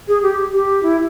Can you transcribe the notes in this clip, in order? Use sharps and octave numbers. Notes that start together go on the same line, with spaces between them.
G#4
G4
G4
E4